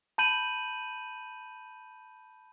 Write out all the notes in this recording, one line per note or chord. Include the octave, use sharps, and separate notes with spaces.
A5 B5 G6 D#7 F#7